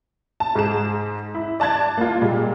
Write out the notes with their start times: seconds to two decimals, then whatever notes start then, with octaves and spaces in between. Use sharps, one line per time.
0.40 A5
0.55 G#2 G#4 E7
1.35 E4
1.60 D5 A5 F#6 G#6 A6
1.97 A#3 F4
2.22 A#2 G3 G#3